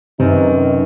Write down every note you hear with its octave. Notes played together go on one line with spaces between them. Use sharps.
F#2 C3 D#3 D#4 B4